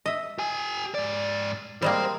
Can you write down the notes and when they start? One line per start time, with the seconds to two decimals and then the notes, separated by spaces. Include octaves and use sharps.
0.06 D#5 E5
0.38 G4 G#5
0.95 G#2 D5
1.82 G3 G#3 A#3 C5 G5